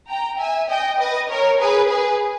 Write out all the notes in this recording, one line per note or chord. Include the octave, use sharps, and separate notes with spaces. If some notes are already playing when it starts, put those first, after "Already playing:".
G5 A#5
E5 G#5
D#5 G5
B4 D#5
A#4 C#5
G#4 B4
G#4 B4